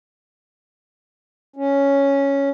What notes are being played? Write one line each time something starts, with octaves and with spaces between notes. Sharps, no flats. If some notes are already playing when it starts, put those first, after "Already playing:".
C#4